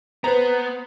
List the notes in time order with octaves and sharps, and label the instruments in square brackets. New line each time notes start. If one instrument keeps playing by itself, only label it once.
[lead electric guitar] B3 [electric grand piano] B4 C5 A#5